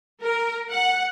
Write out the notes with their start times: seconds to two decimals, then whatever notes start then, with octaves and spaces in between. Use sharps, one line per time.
0.22 A#4
0.72 F#5